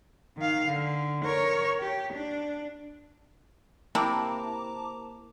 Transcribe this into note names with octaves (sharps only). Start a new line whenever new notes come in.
D#3 F5
D3
A#4 C#5
G4
D4
C3 A#3 E4 A5 A#5 D6